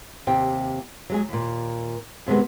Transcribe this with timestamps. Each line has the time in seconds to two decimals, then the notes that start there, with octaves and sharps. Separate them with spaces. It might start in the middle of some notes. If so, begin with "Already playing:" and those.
0.27 D#2 C3 G5
1.10 F#3 G#3 G#4
1.29 D#2 A#2
2.27 F#2 C3 D#3 G#3 B3